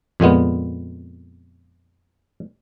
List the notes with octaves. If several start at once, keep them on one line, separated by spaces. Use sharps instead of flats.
F2 A#2 G#3 B3